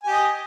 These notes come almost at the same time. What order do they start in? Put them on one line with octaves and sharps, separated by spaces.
G#5 G4 D#5